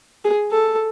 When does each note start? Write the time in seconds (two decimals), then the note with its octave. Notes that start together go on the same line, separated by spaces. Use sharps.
0.24 G#4
0.51 A4